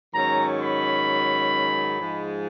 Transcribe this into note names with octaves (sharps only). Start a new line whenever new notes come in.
G#2 D#3 F#3 C#4 A#5
B5
G#2 F3 G#3